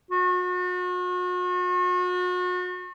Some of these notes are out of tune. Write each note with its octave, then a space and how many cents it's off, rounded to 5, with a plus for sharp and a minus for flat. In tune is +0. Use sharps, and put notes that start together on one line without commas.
F#4 -40